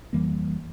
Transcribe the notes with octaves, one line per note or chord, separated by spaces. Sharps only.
F2 E3 G3 A#3